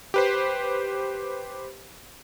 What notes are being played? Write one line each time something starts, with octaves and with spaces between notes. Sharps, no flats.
G4 B4 C5